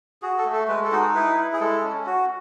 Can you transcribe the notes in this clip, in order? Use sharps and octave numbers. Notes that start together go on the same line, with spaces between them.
F#4 G#4
A4
A3
A4
G#3 B4
A4
D#4 F#4
G#4
E4 B4
E4
G#4
G#3 A4
C#4
F#4